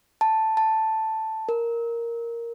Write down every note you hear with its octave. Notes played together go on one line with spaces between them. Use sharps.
A5
A5
A#4